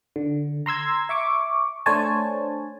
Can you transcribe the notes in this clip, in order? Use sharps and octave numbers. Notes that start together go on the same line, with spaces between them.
D3
A#5 C6 E6 G#6
E5 C#6 D6
A3 D4 C5 C#5 G#5 A5